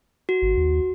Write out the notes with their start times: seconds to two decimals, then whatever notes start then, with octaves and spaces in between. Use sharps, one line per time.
0.29 F#4
0.42 G#1
0.57 D#2